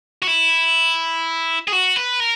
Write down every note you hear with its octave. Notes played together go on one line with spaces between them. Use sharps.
F#4
E4
G#4
F#4
B4
A#4